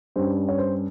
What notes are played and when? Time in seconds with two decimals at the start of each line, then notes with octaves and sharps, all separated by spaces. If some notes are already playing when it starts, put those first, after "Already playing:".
0.16 G2 G3 C#4 C5
0.48 C#5
0.58 C5